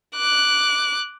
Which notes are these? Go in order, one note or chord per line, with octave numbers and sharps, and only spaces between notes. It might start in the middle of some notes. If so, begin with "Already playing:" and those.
D6 F#6